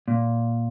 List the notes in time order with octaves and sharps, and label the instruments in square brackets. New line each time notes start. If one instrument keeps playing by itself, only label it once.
[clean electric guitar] A#2